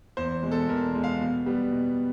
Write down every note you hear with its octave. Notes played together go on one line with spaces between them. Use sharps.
E2 C5
B2 G#3
A4
E2 A#4
B2 G#3
F5
B2
G3 B3
B2